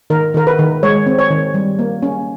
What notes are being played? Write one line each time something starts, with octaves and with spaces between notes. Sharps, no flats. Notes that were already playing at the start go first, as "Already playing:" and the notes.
D#3 A#4
D#3 A#4
B4
D#3
G#3 C#5
C4
C#5
D#3
G3
A#3
C#4